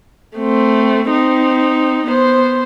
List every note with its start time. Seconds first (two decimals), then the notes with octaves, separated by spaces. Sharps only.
0.37 A3 C4
1.10 C4 D#4
2.07 B3 C5